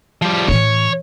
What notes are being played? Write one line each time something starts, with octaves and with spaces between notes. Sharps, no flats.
F3 G3
A2 E3 C#5